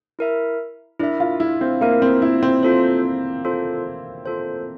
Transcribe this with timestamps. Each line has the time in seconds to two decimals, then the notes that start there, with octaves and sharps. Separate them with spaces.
0.19 E4 A#4 E5
0.99 D4 E4 A#4 E5
1.20 F4
1.40 E4
1.61 C4
1.81 A#3 E4 A#4 E5
2.02 C4
2.22 E4
2.43 C4
2.63 F4 A4 C5
3.45 F4 A4 C5
4.26 F4 A4 C5